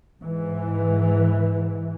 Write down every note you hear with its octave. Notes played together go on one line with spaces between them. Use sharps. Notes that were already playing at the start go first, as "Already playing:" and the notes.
G#2 E3